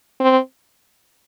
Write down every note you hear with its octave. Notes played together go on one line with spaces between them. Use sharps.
C4